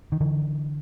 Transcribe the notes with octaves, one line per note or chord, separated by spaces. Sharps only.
D#3
D3 E3